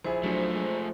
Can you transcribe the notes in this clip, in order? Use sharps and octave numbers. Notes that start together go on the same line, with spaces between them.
A#1 E4 G#4 C5
F3 F#3 A3 D4
G#3